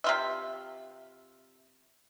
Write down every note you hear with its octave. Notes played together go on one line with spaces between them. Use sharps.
C3 F4 E5